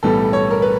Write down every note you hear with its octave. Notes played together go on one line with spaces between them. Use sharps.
B1 A2 E3 G3 A4
C#5
A#4
B4